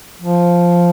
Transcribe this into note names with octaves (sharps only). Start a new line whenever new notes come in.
F3